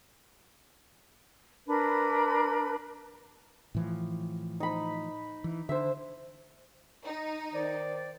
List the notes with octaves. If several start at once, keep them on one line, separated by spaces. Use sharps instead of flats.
D4 A#4 B4 B5
A2 E3 F3
D#4 B5
E3
D3 C5 E5
D#4
D#3 C5 D5